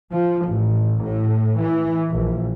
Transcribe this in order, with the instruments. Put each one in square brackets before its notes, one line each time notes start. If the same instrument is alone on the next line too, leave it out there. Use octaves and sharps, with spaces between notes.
[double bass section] F3
A1
A2
E3
A#1